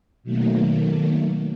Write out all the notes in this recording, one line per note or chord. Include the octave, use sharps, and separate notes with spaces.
B2 D#3 F#3 A3 A#3